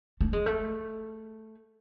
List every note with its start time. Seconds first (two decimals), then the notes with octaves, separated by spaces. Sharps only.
0.21 A3
0.33 G#3
0.46 A3